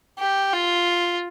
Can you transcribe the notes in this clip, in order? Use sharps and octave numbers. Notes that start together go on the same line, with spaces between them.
G4
F4